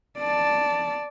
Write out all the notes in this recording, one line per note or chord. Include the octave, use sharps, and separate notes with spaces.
D5 A5